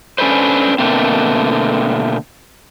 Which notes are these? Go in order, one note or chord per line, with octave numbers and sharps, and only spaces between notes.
C#4 D4 A4 B4 C5
B2 D3 F3 A3 A#3 C4